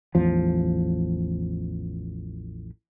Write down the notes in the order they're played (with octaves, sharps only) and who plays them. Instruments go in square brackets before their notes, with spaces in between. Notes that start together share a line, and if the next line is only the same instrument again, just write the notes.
[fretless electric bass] A1 E2 F3